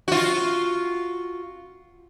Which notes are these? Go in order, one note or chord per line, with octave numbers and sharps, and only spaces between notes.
F4 F#4